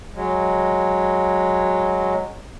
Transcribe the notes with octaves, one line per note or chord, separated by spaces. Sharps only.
F#3 G#3